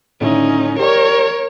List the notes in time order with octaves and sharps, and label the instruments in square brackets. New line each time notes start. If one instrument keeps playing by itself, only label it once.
[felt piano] A2 D3 D#3 [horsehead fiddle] C#4 D#4
[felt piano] G4 D5 C#6 [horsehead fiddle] A#4 C#5